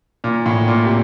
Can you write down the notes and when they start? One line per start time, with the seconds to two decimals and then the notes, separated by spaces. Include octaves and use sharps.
0.24 A#2
0.46 A2
0.68 A#2
0.84 C3